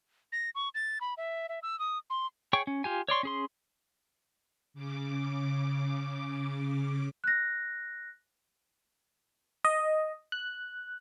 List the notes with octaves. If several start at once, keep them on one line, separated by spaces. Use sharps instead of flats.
A#6
C#6
A6
B5
E5
E5
E6
D#6
C6
G#4 C#5 G5 C#6
C#4
F4 G4 G#5
C#5 D5 C6 C#6
C#4 G#4 C6
C#3 D6
F#6 A#6
D#5
F#6